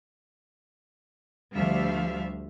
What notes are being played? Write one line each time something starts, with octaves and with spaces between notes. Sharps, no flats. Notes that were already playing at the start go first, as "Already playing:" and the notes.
D2 F3 G3 E5 F5